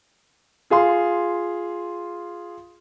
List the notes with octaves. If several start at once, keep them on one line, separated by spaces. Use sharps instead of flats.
F4 G#4 F5 C6